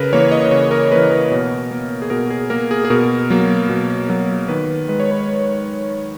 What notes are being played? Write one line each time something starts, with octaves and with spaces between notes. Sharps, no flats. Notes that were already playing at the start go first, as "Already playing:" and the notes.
Already playing: C#3 A#4 B4
E3 A#3 C#5
D#5
C#3 C#5
A#4
E3 A#3 B4
A#4
B2
A#3
G#4
B2 A#4
G#4
A#3 A#4
G#4
G#4
B2 A#4
F#3 A#3
B2
F#3 A#3
D#3 B4
G#3 B4
C#5
B4